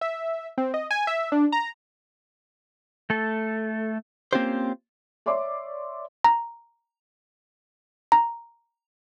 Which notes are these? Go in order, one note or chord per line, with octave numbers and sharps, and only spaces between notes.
E5
C4
D#5
G#5
E5
D4
A#5
A3 A4
A#3 C4 C#4 F4 G4 C5
C#5 D5 E5 C6 D6
A#5
A#5